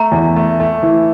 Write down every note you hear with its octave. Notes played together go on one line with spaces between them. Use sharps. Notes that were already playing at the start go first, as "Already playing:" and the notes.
Already playing: A3 A#5
E2
A3
A3
E3